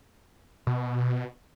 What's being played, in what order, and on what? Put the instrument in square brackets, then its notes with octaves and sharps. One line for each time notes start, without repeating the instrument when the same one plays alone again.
[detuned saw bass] B2